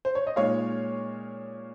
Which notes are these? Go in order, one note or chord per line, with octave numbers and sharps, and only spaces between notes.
C5
C#5
D#5
A#2 G#3 D#4 C#5 F5